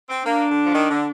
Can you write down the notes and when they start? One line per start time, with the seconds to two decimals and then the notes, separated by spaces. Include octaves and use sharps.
0.10 C4
0.25 A#3 D4
0.49 D3
0.66 F3
0.73 D#3
0.90 D3